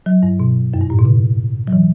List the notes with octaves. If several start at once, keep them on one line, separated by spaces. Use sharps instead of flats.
F#3
G2
B2
F#2
G2
A2
B2
C#3
F#3
E3